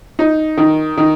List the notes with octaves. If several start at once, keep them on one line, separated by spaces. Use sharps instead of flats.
D#4
D#3
D#3